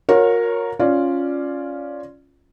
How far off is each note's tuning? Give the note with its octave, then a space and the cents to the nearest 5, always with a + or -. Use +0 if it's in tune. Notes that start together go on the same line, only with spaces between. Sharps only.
F#4 -45 A#4 +0 C#5 +0
C#4 +0 F4 +0 D5 +0